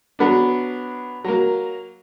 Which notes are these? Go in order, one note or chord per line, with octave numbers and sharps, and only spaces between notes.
F#3 B3 D4
F#3 A#3